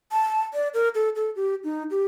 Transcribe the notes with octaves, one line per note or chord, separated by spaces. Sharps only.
A5
D5
A#4
A4
A4
G4
D#4
G4